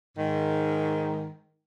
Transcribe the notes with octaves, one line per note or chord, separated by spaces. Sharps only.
G#2 D#3